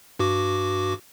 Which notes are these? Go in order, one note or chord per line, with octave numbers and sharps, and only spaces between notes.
G2 F#4 D6